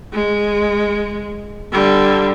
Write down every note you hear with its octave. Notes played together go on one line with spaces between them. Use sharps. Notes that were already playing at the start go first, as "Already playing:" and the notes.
G#3
D3 G3